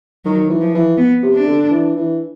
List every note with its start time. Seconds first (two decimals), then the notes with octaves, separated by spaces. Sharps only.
0.25 D#3 F#3
0.49 E3
0.61 F3
0.74 E3
0.98 B3
1.23 C3
1.34 D4
1.47 D3
1.71 E3
1.96 E3